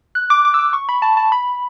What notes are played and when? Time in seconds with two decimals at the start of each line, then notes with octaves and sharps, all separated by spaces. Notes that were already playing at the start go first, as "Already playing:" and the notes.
0.15 F#6
0.30 D6
0.45 D6
0.54 E6
0.59 D6
0.73 C#6
0.89 B5
1.02 A5
1.17 A5
1.32 B5